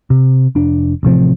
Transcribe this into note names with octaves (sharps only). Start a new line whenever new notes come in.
C3
F1 D4
A1 C3 F3 C4